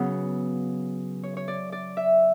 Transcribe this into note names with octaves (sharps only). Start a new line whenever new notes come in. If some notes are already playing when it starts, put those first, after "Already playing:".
Already playing: C#3 F#3 B3
C#5
C#5
D5
D5
E5